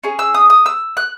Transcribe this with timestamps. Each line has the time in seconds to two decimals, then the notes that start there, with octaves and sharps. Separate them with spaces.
0.03 C#4 G#4
0.19 E6
0.35 D#6
0.50 D#6
0.66 E6
0.97 F#6